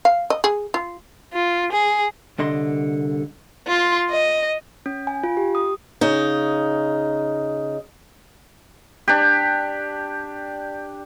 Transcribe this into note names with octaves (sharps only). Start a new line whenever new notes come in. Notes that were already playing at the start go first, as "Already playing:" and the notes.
F5
D#5
G#4
F4
F4
G#4
C2 D3 D#5 C6
F4 C6
D#5
C#4
G#5
F4
G4
D#6
C#3 D#4
D4 G4